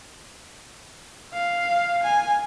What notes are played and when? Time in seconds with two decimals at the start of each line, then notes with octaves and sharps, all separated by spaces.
1.34 F5
2.03 G#5